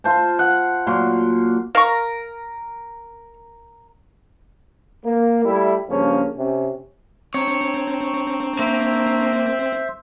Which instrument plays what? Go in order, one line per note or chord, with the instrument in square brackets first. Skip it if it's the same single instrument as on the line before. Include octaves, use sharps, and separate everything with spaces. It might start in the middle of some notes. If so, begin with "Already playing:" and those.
[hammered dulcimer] F4 C5 A5
F#5
A#2 F#3 C6
[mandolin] A#4 [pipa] F5 C#6
[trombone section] A#3
G3 A3 E4
G2 C#3 F3 A#3 C#4
C3 C#4
[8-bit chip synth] C4 [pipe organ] D4 A#5 C#6 [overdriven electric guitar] C#5
[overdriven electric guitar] A#3 [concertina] C5 E5